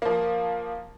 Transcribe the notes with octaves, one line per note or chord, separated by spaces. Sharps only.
F3 A#3